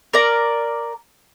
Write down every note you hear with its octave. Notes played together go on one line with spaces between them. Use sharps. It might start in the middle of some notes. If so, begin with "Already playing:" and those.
A#4 D5 A#5